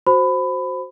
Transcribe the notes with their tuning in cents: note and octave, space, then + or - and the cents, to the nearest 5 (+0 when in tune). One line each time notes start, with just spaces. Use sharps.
F#4 +0 C5 +0 B5 +20